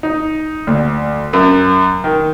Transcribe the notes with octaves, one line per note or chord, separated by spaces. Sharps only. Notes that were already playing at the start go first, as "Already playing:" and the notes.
D#4
D2
F#2
D#3